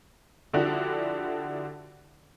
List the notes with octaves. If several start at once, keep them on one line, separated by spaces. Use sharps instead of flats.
D3 F3 D4 E4 F#4 G4